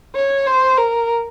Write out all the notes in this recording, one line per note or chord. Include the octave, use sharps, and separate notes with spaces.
C#5
C5
A#4